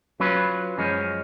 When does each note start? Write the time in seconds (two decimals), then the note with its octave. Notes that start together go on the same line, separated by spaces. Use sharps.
0.20 F#3 C#4 F4 B4
0.78 F#2 F3 G#3 C#4